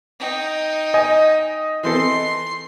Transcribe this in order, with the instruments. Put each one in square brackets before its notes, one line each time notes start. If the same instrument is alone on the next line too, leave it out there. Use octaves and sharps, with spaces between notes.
[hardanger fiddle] D#4 G5
[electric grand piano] D#5 [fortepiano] G#5
[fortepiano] E3 C4 A4 [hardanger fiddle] C6